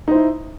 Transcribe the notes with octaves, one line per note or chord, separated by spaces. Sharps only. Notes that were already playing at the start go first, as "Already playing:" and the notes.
D#4 E4 C5